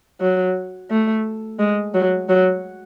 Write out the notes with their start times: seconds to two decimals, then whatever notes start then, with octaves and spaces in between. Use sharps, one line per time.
0.21 F#3
0.90 A3
1.59 G#3
1.94 F#3
2.29 F#3